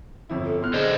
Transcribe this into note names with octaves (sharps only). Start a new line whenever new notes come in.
G1 F2 E4
A4
B3 C6 F6 F#6
D3 G#4 C5 D#5